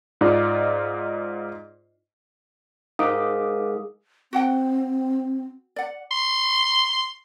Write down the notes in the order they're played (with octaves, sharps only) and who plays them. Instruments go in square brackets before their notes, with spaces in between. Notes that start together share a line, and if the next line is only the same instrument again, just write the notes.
[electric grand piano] G#2 D#4 F4 D5
[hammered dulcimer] G#2 [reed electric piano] D#4 D6 [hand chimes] A#4 F5 D#6
[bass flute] C4 [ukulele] F#4 F#5 G5
[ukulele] D5 F#5
[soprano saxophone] C6